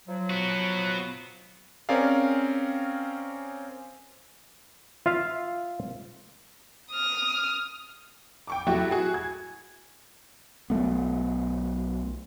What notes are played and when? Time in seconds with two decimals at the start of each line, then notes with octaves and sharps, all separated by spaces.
0.08 F3 F#3
0.30 B3 F#4
1.89 C4 C#4 G#4 A#4 D5 F5
5.06 F4 E5 F5
6.91 D#6 F6
8.47 G5 C#6 D6
8.67 F#3 A3 E4 F#4 G4
8.91 F#4 G#4
9.14 G#6
10.70 B1 F#3 A3 B3